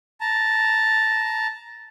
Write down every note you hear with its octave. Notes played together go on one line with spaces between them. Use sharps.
A5 A#5